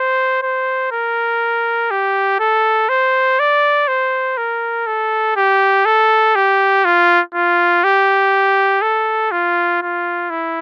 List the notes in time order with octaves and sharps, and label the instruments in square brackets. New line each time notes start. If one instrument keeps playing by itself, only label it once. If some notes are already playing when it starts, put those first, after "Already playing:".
Already playing: [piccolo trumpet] C5
C5
A#4
G4
A4
C5
D5
C5
A#4
A4
G4
A4
G4
F4
F4
G4
A4
F4
F4
E4